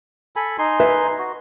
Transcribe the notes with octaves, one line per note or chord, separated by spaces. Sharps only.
A4 G#5 B5
D#4 G#5 C6
B4 E5
F#4